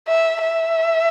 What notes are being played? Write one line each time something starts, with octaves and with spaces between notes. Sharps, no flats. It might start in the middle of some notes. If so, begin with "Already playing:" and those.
E5
E5